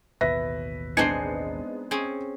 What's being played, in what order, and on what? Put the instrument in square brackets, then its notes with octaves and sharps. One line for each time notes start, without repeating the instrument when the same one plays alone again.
[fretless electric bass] A1 D#2 B2 [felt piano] B4 E5 A#6
[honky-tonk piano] G#3 B3 D#4 [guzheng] C4 D4 G#5 [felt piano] C7 C#7
[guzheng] C4 C#4 G#4